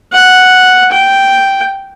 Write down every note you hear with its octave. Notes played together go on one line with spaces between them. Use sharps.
F#5
G5